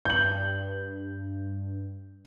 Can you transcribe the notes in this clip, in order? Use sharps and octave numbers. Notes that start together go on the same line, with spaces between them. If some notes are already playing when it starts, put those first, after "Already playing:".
G2 G6 F#7